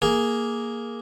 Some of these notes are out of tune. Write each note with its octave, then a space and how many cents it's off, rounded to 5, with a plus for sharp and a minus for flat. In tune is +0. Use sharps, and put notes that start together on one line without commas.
A#3 +0 G#4 +0